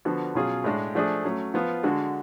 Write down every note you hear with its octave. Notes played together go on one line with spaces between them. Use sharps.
D3 F3 B3 F#4
B2 F#3 C#4 F4 G#4
A2 G#3 D4
F3 A3 D4 G#4
F#3 A3 C#4
F3 B3 F4
D3 G#3 D4 F#4